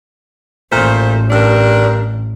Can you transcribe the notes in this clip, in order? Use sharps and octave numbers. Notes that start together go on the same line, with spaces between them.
A1 A#2 A3 C5
G2 D4 A#4